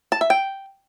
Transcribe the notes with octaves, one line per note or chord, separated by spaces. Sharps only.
A5
E5
G5